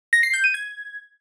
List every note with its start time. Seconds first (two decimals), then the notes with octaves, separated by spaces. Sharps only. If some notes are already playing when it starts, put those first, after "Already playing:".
0.13 A#6
0.23 C7
0.33 G6
0.44 D#7
0.54 G#6